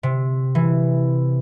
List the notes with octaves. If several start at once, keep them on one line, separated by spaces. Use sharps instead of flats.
C3
E3